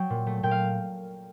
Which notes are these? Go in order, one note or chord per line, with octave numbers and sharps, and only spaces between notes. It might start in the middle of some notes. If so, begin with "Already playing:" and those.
Already playing: F#3 G5
A#2
A3
A#2 G5
F5